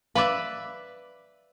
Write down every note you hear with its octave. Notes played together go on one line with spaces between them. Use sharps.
B4 D5 E5 F5 B5 D6